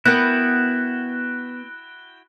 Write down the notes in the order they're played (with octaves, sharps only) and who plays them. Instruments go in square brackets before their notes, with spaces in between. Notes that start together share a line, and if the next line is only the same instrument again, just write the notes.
[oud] B3 A#4 [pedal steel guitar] E4 F#4 G5 [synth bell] F#6